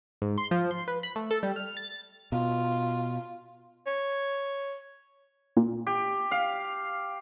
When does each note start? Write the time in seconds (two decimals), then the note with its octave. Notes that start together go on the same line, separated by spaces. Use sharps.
0.22 G#2
0.38 C6
0.51 F3
0.71 C6
0.88 B4
1.03 B5
1.16 A3
1.31 A4
1.43 G3
1.56 F6
1.77 A6
2.32 B2 F4
3.87 C#5
5.57 A#2
5.87 G4
6.31 F5